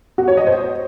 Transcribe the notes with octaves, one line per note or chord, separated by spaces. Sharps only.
F#4
C#5
D#5
C5